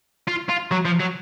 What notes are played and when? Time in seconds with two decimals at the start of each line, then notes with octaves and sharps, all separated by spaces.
0.28 F4
0.49 F4
0.72 F#3
0.86 F3
1.00 F#3